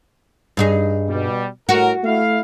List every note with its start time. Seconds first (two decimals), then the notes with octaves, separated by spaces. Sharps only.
0.57 G2 D#4 G#4
1.09 B2 G3
1.69 A2 F#4 A#4
2.04 A3 E4 F5